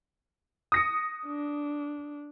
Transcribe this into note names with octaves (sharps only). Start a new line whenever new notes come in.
D#6 A#6 C#7
D4